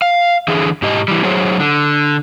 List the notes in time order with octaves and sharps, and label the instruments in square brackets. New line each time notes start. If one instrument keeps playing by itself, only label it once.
[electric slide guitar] F5
D3 E3 G#4
G#2 G4 D#5
E3 G3
F#3 G#4 C5 C#5
D3